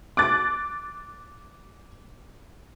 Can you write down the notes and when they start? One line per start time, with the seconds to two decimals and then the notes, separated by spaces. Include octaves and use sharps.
0.17 D6 F#6 A6